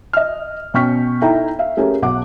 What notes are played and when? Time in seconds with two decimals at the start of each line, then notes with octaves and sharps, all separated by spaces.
0.13 D#5 F6
0.74 B2 C#4 G5 C#6 F6 B6
1.21 D#4 E4 A4 E5 G5 A#5
1.59 E5 F5
1.77 A3 C#4 G4 G#4 A#4
2.02 B1 F#5 D6